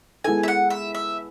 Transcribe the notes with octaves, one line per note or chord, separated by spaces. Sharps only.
G#3 B3 E4 A4 G#5
E5
F#5
E5
E5